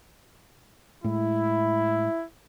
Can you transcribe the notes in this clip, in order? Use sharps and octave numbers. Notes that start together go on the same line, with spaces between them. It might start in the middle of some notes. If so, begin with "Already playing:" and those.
A2 G#3 E4